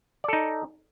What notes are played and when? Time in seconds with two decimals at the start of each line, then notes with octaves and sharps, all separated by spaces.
0.24 D5
0.28 A4
0.33 D#4